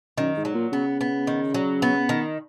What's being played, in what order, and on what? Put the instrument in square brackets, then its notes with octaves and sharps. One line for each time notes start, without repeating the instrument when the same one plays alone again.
[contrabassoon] F#2 [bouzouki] D#3
[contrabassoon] G#2
[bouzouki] F#3
[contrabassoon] A#2
[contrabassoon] C#3 [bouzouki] B3
[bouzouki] B3
D#3
F#3
B3
D#3